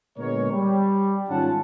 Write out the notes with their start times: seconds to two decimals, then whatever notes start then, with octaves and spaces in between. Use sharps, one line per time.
0.18 A#2 D3 G#3 B3 A#4 C#5
0.52 G3
1.29 G#2 D#3 C#4 F4 F#5 A5